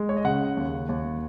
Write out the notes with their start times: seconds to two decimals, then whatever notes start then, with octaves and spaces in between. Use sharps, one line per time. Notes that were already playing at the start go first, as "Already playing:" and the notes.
Already playing: G#3
0.09 C#5
0.17 D#5
0.24 C#3 F#5
0.57 D#2
0.89 D#2